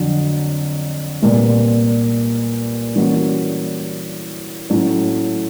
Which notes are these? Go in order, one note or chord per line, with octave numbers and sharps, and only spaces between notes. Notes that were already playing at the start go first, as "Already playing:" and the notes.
Already playing: F2 D3 F#3
C2 A#2 G3 B3
E3 G3 A#3 C#4 F#4
A2 F#3 A3 C#4